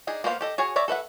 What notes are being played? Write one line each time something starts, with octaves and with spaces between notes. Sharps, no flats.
D4 D#4 G#4
A#3 B3 C5 D5 F5
G4 A4 D#5
F#4 G#4 C#5 G#5 A5
C#5 D5 E5 A#5
A4 B4 E5 F#5